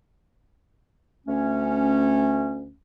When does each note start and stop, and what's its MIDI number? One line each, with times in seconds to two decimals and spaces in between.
1.27 2.71 38
1.27 2.71 57
1.27 2.71 61